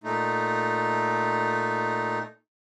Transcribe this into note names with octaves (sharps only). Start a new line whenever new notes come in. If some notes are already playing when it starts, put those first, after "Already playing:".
A#2 A3 D#4